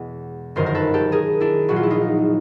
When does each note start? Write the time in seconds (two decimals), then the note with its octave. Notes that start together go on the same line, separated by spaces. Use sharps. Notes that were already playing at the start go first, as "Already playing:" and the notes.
Already playing: E2 B2 G#3 G#4
0.56 G1 F#2 D#3 A#4 C5
0.66 A#4
0.75 A4 B4
0.94 G4 A4
1.12 G#4 A#4
1.40 D4 E4
1.68 A#1 A#2 F#3 F#4
1.76 F4
1.83 E4
1.90 D#4 F4